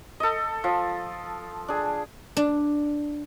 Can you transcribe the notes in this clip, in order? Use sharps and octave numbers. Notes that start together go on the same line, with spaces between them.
A4 D#5
F3
D4 G#4
D4